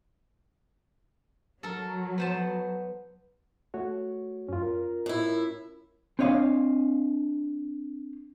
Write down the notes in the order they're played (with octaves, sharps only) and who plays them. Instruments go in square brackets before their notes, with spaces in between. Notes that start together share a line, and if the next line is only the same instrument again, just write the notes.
[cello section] F#3 [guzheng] A4 A#4
[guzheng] B3 C5 A5
[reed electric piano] A3 F#4 C#5
[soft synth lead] F#2 [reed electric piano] C#4 F4
[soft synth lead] A#4
[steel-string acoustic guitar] A2 E4
[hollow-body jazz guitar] C4 D4 C#5 D#5 F5